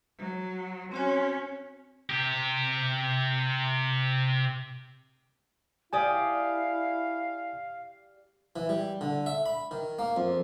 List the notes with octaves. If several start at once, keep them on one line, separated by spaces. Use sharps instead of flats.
F#3
C4 C#4 F#4 C#5
C3 G4
E4 G4 D5 F5 G#5 D#6
E3
G3
D3
E5
B5
D#3
A#3
F2